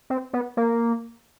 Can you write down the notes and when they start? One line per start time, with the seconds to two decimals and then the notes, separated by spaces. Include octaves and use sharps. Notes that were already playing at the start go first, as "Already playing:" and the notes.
0.10 C4
0.33 B3
0.57 A#3